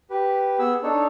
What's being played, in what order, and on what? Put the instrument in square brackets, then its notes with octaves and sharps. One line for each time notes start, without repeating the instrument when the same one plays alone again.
[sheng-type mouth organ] G4 B4
B3 G#4 E6
D4 D#4 A4 C#5